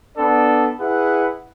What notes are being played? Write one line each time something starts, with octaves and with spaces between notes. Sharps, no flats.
B3 D4 A4 D5
E4 G#4 B4 F#5